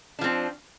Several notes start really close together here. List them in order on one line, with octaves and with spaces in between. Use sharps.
D4 F3 C4